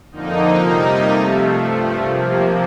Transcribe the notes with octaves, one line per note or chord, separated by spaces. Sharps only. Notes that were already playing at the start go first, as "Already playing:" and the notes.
F2 D3 F3 A#3 D#4
C3 G3 A#3 D#4
C3 F3 A3
G2 F3 A3
C3 F3 A#3